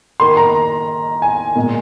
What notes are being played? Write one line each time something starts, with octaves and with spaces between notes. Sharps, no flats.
D#3 A#3 C6
A#5
G#5
A#2 G#3